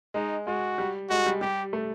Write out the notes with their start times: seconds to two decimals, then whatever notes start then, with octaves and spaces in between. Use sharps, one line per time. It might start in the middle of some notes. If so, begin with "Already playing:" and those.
0.14 G#3 D#4
0.47 G#3 F#4
0.78 G3
1.10 G#3 F#4
1.26 G3
1.41 G3 G4
1.73 A3